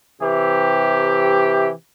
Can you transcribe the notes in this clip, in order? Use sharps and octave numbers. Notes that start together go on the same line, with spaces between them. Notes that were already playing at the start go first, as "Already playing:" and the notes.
C3 E3 G4